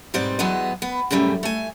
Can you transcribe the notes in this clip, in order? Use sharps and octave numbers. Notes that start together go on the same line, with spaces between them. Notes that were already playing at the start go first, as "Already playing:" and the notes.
G#2 B2 G3 C4 D5
E2 E3 F#3 G#3 B3 D#5
B3
F#2 A2 C#3 G3 A3
A3 G#5